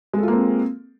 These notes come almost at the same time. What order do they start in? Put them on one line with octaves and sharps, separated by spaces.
G#3 A4 F4 A#3 C4